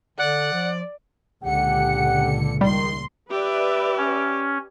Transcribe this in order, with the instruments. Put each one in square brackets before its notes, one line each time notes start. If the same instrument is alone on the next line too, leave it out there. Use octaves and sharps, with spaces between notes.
[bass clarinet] D3 [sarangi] D5 [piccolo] F#5
[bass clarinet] F3
[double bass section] C#2 A#2 [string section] D3 C#7 [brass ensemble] G4 F#5
[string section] A#1 C6 [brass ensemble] D#3 [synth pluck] G3
[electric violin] G4 [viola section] B4 D5 E5
[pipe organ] C#4